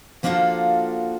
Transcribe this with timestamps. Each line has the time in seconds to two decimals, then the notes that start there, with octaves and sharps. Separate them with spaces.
0.23 F3 A#3 D4 F4 F#4 A4